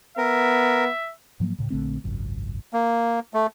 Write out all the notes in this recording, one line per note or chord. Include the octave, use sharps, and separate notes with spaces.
B3 A#4 E5
G#2 F3 F#3 A#3
D2 A2 C#3
A#1 D3 A3 C4
G#1 C#2 F#2
A#3
A3